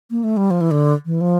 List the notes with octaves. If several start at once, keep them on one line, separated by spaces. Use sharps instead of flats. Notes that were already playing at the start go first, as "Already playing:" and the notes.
A#3
A3
G3
F3
E3
D3
E3
F3